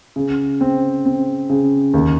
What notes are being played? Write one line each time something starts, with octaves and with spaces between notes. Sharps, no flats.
C#3
C4
C4
C#3
D#2